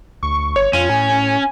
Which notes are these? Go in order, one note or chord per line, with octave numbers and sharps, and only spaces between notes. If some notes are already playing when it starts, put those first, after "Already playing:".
D2 C#6
G1 C#5
F2 C#4 F4 D#7
A2 G#5